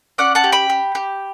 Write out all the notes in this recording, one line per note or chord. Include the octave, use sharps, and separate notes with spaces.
C#4 D5 F#5
F#5 A5
G4
G5 B5
G4
G4